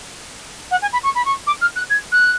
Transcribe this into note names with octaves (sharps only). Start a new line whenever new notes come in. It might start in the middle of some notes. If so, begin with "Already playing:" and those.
F#5
G#5
B5
C#6
B5
C#6
D6
F6
F#6
G#6
F#6